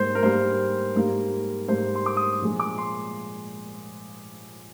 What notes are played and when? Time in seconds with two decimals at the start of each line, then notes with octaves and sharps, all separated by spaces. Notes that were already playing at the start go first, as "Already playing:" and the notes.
Already playing: G#2 G3 A#3 C5
0.15 A#4
0.23 G#2 G3 A#3 C5
0.96 G#2 G3 A#3
1.68 G#2 G3 A#3 C5
1.95 C6
2.06 D6
2.17 D#6
2.42 A#2 F3 G#3
2.60 D6
2.78 C6